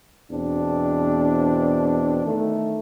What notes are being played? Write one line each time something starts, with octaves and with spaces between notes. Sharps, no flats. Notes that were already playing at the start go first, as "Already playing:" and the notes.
E2 B2 C4 D4
D#3 A3